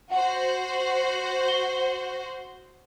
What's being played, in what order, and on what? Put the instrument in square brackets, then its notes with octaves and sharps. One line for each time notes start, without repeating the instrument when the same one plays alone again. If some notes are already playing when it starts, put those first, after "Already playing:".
[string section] F#4 C5 [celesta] F#5
[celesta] G7